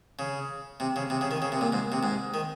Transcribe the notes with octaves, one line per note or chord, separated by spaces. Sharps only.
C#3
C3
C#3
C3
C#3
D#3
C#3
C3
A#2
G#2
C3
G#2
D#3